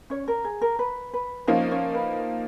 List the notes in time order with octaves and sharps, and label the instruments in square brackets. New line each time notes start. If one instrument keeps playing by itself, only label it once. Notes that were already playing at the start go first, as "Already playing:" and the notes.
[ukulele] C#4 C#5
A#4
G#4
A#4
B4
B4
[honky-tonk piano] F3 A#3 D#4 [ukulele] C#4 C#5
[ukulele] C#4 C#5
B4